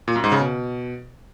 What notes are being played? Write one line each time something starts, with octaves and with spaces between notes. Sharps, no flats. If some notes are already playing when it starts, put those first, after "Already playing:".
A#2
F#2
G#2
C#3
B2